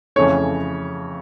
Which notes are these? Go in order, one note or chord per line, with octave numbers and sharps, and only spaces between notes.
F2 C#3 E3 A3 C#5